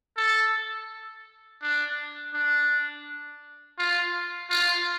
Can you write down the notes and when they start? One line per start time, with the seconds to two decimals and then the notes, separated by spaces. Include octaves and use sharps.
0.17 A4
1.62 D4
2.34 D4
3.79 F4
4.50 F4